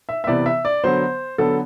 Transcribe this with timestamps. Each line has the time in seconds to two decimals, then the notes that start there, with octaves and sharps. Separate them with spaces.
0.09 E5
0.24 E5
0.27 C3 E3 B3 D5
0.46 E5
0.65 D5
0.84 D3 F#3 B3 C5
1.38 D3 F#3 B3 A4